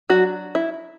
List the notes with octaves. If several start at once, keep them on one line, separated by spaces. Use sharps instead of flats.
F#3 D4 F#4
E4